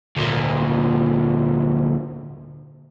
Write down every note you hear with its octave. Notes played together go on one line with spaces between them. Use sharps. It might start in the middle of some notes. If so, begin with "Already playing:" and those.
D2 A#2